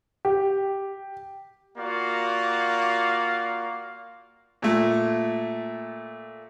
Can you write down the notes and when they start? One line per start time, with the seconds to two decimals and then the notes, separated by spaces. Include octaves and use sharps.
0.25 G4
1.78 A#3 F4 F#4 D5 F5
4.62 A#2 A3